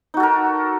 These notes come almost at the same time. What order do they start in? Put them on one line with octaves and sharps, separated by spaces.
D#4 F#4 A4 A#4